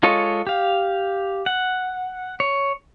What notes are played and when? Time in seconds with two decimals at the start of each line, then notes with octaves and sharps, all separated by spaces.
0.03 G#3 F4 A4 C#5 D#5
0.47 G4 F5
1.46 F#5
2.40 C#5